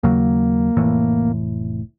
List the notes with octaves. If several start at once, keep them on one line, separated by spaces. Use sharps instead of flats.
D#2 C#3 F#3 A#3
F1 A2 E3